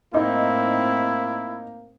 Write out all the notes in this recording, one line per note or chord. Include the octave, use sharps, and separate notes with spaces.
A2 A#3 C4 D#4 E4